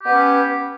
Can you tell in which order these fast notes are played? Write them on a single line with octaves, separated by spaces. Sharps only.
G4 B3 B4 C#4